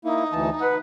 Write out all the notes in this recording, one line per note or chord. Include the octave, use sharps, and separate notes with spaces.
A#3 D#4 E4
D2 E3 A5
B4 F#5